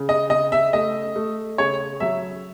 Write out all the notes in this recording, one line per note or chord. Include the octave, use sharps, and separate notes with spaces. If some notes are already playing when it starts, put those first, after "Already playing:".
Already playing: C#3
D#5
C#3 D#5
E5
A3 D#5
A3
C#3 C#5
F#3 E5